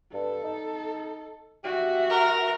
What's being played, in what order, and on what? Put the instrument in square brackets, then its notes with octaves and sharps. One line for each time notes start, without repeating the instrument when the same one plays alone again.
[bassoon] G2 [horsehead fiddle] A4
[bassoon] D#4
[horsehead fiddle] F#4 E5 [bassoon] G4
[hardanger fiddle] A#4